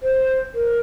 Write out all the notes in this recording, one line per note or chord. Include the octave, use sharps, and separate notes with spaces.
C5
A#4